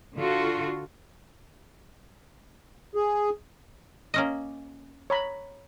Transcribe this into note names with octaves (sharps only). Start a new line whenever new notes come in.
D3 F4 F#4 A4
G#4
A#3 C#4 D#5
C#5 A#5 B5